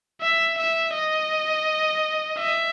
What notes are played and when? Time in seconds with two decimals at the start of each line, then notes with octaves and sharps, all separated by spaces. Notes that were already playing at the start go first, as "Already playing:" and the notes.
0.22 E5
0.58 E5
0.95 D#5
2.38 E5